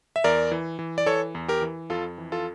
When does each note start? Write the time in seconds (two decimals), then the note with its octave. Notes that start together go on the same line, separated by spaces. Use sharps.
0.16 E5
0.24 E2 A#4 D5
0.52 E3
0.79 E3
0.98 D5
1.06 E3 A4 C#5
1.35 E2
1.48 G4 A#4
1.62 E3
1.90 F2 F4 A4
2.18 E3
2.32 F4 A4